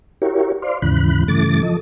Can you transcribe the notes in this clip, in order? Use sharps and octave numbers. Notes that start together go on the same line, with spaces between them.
E4 F#4 G4 A#4 C#5
C5 D5 F5 C6
D#2 G#2 C#3 E3 B5 F#6
G2 C#3 E3 A3 D6 A6
F3 A4 D#5